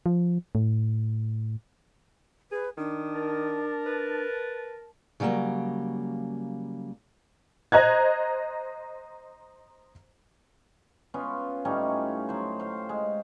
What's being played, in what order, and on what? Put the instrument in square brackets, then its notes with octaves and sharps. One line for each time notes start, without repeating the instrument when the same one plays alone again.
[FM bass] F3
A2
[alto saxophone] G#4 [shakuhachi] B4
[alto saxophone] D#3 [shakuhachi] D4
[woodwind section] A#4 A5
[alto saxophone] B4
[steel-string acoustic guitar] C#3 F#3 G3 A3 A#3
[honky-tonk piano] C5 D#5 A#5 F#6 G#6
[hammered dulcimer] B3 C#4 F4
A2 G3 C#4 D#4
F#3 C5
C5 F5
G#3